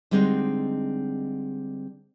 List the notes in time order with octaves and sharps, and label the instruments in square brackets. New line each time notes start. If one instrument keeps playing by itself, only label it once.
[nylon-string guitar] D3 G3 G#3 C4 D4 D#4